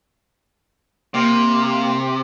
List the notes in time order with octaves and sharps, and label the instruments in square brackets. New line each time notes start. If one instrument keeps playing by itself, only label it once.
[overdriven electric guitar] C3 [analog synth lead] A#3